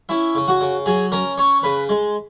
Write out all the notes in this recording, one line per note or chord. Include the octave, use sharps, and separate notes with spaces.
C#4 E4 E5
C#3
F#4 F#5
C#3
F#3 G#4 G#5
C#4 A#4 A#5
C#4 C#5 C#6
C#3 B4 B5
G#3